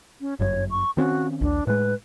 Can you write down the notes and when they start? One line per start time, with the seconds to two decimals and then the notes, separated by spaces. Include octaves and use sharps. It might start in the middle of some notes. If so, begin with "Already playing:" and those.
0.21 C#4
0.40 G1 F#2 C#5
0.71 C#6
0.97 D#3 C4 C#4 F#4
1.41 A#1 D#2 D4
1.67 A2 G#3 B4